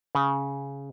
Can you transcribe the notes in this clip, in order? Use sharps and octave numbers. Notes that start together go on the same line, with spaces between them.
C#3